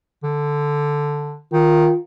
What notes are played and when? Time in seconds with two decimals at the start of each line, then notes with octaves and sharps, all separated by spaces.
0.24 D3
1.53 D#3 F4